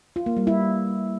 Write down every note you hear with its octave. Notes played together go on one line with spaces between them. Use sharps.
F4
A#3
G3
E4